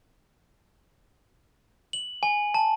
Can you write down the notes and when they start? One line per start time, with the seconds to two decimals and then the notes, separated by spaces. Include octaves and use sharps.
1.93 F#7
2.23 G#5
2.54 A5